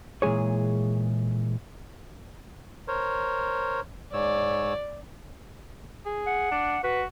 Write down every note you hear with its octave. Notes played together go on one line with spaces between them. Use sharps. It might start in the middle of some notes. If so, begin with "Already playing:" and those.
A#2 E3 G#3 G#4 C#5
A#4 C5 C#5
G#2 C#5 D5 E6
G#4
F#5
D4
F#4 B4